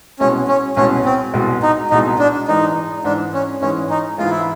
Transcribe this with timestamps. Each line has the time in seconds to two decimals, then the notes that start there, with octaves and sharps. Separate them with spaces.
0.20 C2 B2 G#3 C#4
0.48 C#4
0.76 C2 B2 G#3 C#4
1.05 C4
1.34 C2 B2 G#3
1.63 D#4
1.90 C2 B2 G#3 D#4
2.19 D4
2.48 G#2 E3 G#3 D#4
3.04 G#2 E3 G#3 D4
3.34 C#4
3.61 G#2 E3 G#3 C#4
3.90 D#4
4.18 G#2 E3 G#3 F4
4.30 E4